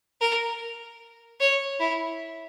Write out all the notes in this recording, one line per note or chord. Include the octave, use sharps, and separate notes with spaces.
A#4
C#5
E4